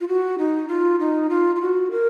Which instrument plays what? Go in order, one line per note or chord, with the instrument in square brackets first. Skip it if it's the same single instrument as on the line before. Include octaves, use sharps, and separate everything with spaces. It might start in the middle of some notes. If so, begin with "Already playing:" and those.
[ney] F4
F#4
D#4
F4
D#4
F4
F4
F#4
A#4